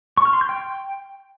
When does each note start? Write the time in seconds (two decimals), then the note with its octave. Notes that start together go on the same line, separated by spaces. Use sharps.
0.17 C#6
0.25 F6
0.33 C6
0.41 G6
0.49 G5